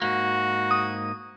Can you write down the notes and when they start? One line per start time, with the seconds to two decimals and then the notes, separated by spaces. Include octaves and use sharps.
0.02 G#2 A#3 F#4
0.71 D#6